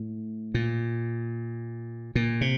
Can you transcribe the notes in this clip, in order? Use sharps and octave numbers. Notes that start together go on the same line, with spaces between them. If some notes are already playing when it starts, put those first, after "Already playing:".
Already playing: A2
A#2
A#2
C3